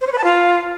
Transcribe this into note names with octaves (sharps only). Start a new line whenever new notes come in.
C5
C#5
B4
A5
F4